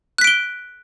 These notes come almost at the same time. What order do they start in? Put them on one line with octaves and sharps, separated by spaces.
F#6 B6 D7 G7